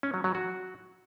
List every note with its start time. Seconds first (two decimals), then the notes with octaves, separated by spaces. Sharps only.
0.03 C#4
0.14 F#3
0.24 F#3
0.35 F#4